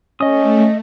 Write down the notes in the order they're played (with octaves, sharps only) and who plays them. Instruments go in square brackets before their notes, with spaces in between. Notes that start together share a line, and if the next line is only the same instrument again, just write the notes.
[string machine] A3 [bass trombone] C#4 [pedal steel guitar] D#5 D#6